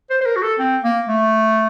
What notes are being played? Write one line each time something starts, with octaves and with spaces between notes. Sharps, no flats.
C5
C5
A#4
F#4
A4
C4
A#3
A3